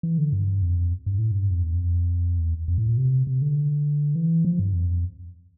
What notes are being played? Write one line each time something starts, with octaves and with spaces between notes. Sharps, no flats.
E3
D3
G2
F2
G2
A2
G2
F2
E2
F2
E2
F2
A2
A#2
C3
C3
D3
E3
F3
G2
F2